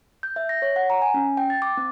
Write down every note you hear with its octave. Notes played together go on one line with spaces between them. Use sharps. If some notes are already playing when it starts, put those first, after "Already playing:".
G6
E5
A#6
C#5
F#5
A#5
G#5
C#4
G5
A6
D6
C4